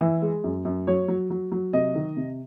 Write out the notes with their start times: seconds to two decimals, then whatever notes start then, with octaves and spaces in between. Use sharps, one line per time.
0.01 E3 E4
0.22 G#3
0.44 F#2
0.65 F#2
0.87 F#3 C#5
1.08 F#3
1.30 F#3
1.52 F#3
1.73 C3 D#5
1.95 D#3
2.17 C3